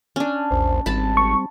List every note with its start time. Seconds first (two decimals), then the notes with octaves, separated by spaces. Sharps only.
0.16 C#4 D4
0.51 A#1 E2 C5
0.86 G#1 G3 C4 A5 B5
1.17 C#6